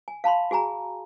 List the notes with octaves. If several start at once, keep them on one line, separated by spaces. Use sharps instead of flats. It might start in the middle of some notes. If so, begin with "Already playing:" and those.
G#5
F5 A5 B5 C6
F#4 G#4 G#5 A#5